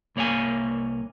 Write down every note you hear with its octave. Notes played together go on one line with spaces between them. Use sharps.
C2 A#3 C#5 F5 G#5